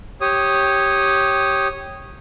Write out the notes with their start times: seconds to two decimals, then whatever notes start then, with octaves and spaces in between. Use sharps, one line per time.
0.21 G4 C#5 D#6